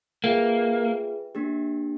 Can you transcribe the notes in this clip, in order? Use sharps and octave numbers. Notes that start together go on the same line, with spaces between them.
A#3 F4 G#4 B4 E5 G5
A#3 D4 G4